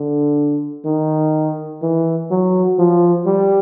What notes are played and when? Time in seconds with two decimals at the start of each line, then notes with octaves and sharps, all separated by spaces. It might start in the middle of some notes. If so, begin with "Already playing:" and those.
Already playing: D3
0.85 D#3
1.82 E3
2.31 F#3
2.78 F3
3.27 G3